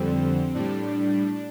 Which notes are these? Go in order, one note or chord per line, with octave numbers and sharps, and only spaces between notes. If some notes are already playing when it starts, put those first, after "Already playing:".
Already playing: F2 D3 G3 C4
A2 G3 D4